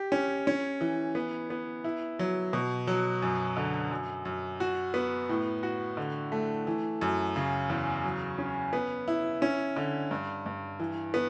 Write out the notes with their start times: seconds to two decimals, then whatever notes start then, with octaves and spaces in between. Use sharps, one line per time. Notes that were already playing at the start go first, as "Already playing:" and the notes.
Already playing: G4
0.12 C#4
0.47 C#4
0.81 E3
1.15 B3
1.50 B3
1.84 E4
2.19 F#3
2.53 B2
2.87 F#3
3.22 F#2
3.57 D3
3.91 F#2
4.25 F#2
4.60 F#4
4.94 B3
5.29 A2
5.63 F#4
5.97 D3
6.32 A3
6.67 E3
7.01 F#2
7.36 C#3
7.70 E2
8.04 F#3
8.38 C#4
8.73 B3
9.08 E4
9.42 C#4
9.76 D3
10.11 G2
10.46 G2
10.80 E3
11.14 B3